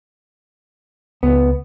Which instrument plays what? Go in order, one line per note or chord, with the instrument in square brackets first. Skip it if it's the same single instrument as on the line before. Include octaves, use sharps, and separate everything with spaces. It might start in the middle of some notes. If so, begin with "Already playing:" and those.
[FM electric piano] C#2 [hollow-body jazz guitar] B3